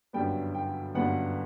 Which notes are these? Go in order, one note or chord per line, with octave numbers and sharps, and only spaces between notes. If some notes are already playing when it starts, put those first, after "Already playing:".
G1 F#2 D3 G3 B3 G5
G5
G1 F#2 D3 G3 B3 F#5